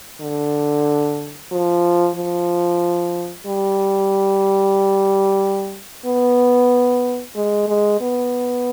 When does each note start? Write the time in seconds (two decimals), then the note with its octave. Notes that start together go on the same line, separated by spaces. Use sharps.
0.21 D3
1.51 F3
2.16 F3
3.46 G3
6.06 B3
7.35 G#3
7.68 G#3
8.01 B3